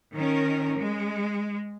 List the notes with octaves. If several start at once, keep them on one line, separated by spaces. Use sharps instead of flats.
D#3 C#4 A#4
G#3